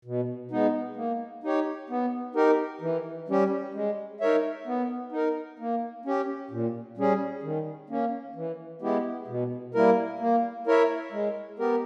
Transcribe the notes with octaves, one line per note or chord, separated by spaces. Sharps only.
B2
G#3 B3 D#4
A#3
D#4 G4 C#5
B3
D#4 G4 A#4
E3
G3 C#4 G4
G#3
D#4 A#4 C#5 E5
B3
D#4 A#4
A#3
C#4 G4
A#2
G3 C#4 G#4
D#3
A#3 C#4
E3
G#3 B3 E4 G4
B2
G3 A#3 E4 A#4
A#3
E4 A#4 C#5 E5
G#3
B3 G4 A#4